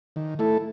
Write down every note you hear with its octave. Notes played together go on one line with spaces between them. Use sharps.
D#3
A3 E4 A4